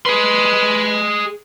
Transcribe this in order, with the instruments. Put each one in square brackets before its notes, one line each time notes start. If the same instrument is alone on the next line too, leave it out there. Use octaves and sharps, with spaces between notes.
[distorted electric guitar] G#4 C6 [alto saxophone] B4